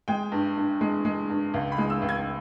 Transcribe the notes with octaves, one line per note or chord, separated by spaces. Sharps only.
G#3 G5
G2
G2
G#3
G#3
G2
C#2
B5
G#3
E6
C#2
G#6